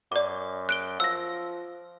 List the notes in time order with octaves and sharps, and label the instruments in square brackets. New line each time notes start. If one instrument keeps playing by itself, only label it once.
[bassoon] F#2 [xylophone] D5 D6
[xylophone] F#6 D7 G7
[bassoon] F3 [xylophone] E6 A#6